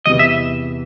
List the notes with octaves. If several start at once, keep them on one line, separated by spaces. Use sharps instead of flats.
E2 C3 E3 D#5
E5